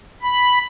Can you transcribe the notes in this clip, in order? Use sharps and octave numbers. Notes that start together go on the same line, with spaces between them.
B5